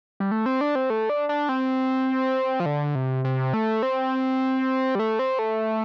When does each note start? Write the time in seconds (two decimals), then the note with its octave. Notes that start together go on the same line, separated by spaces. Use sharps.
0.20 G3
0.31 A3
0.46 C4
0.61 D4
0.75 C4
0.90 A3
1.09 D4
1.29 D4
1.49 C4
2.60 F3
2.66 D3
2.95 C3
3.24 C3
3.54 A3
3.83 C4
4.95 G3
4.99 A3
5.19 C4
5.39 A3